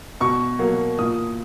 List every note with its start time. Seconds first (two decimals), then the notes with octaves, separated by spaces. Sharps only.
0.20 B2 C#6
0.59 F#3 A#3
0.98 A#2 D#6